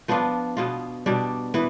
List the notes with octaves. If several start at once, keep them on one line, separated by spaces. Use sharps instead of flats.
F3 B3 D4 F4
B2 B3 F4
B2 G3 D4
E3 B3